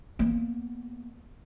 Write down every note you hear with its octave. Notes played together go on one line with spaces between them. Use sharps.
A#3 B3